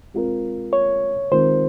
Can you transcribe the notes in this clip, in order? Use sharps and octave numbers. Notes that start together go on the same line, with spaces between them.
G#3 C4 F4 A#4
C#5
D#3 G#3 C4 F4 A#4 C5